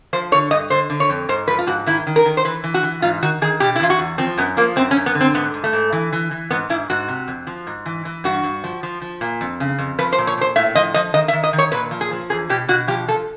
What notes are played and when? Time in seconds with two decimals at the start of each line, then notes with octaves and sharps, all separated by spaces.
0.13 F3 C5
0.32 D3 C#5
0.51 G2 D#5
0.70 D3 C5
0.90 D3
1.00 C#5
1.10 F2
1.29 G#2 C5
1.48 F3 B4
1.59 F4
1.67 G#2 F#4
1.86 D#3 E4
2.07 D#3
2.16 A#4
2.25 D#3
2.37 C5
2.45 E3 B4
2.64 E3
2.74 F#4
2.83 E3
3.02 G#2 F4
3.23 D#3 F#4
3.42 D#3 G#4
3.60 B2 G4
3.75 E4
3.80 E2 F4
3.90 F#4
3.99 E2
4.18 F3 C4
4.38 F#2 B3
4.57 F3 A#3
4.76 F#2 C4
4.91 C#4
4.97 F#2
5.06 B3
5.15 D3
5.21 C4
5.34 G#2 B3
5.54 G#2
5.64 A3
5.73 G#2
5.93 E3
6.12 E3
6.31 E3
6.51 G#2 B3
6.69 G#2 E4
6.90 G#2 F#4
7.08 C3
7.28 F2
7.47 F3
7.67 G#2
7.86 E3
8.05 E3
8.24 G2 F#4
8.44 G2
8.64 F3
8.83 F3
9.02 F3
9.21 A#2
9.41 F2
9.60 C#3
9.78 F2
9.99 F3 B4
10.13 C5
10.18 A#2
10.27 C#5
10.38 A#2 C5
10.56 A2 E5
10.75 F3 D#5
10.94 F3 D#5
11.14 D#3 D#5
11.28 E5
11.33 D#3
11.44 D#5
11.53 D#3
11.58 C#5
11.72 A#2 B4
11.91 F3
12.01 G#4
12.11 F3
12.30 E2 G#4
12.49 B2 G4
12.68 B2 F#4
12.87 F3 G4
13.08 F3 A4